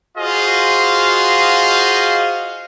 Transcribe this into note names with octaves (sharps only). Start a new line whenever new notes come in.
F4 F#4 G#4 C5 D#5 F5